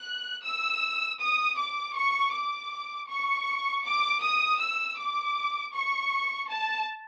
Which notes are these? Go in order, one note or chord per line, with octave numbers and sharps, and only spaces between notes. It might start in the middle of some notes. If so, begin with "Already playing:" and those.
Already playing: F#6
E6
D#6
D6
C#6
D6
C#6
D6
D#6
E6
D6
C#6
A5